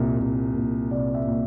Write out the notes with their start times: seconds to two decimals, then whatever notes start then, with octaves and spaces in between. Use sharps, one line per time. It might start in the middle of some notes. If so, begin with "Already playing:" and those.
Already playing: C2 A#2
0.18 C2
0.55 A#2
0.91 C2 D5
1.15 E5
1.27 A#2